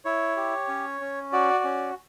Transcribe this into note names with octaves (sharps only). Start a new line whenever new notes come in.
E4 C#5
G4
C#4
C#4
F#4 D5
C#4